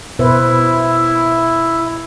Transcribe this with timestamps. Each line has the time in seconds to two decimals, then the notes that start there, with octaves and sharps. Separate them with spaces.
0.19 B2 E4 B4 C5